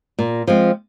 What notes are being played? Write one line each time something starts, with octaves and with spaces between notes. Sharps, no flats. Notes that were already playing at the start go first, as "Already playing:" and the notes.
A#2
F3 G#3 C4